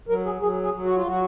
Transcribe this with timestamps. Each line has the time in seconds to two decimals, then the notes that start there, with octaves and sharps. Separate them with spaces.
0.09 F#3 A#4
0.25 G#4
0.41 F#3 G#4
0.63 G#4
0.74 F#3
0.84 F#4
0.96 F4
1.06 F#3 F#4